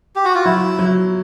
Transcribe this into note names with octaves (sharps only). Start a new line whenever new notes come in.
G4
F#4
F4
F#3 E4
F#3